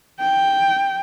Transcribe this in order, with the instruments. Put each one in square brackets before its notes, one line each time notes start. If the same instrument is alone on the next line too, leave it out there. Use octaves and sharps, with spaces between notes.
[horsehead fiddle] G5